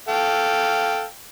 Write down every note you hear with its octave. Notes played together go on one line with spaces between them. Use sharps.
A4 F5 G5